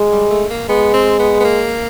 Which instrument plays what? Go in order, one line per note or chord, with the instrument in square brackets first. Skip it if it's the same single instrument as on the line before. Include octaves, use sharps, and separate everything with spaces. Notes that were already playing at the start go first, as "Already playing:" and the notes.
Already playing: [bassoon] G#3
[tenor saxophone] G3
A3
A#3
[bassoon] G#3 [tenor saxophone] B3
[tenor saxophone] C4
B3
B3
A#3